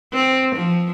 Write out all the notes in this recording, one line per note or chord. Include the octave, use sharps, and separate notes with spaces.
C4
F3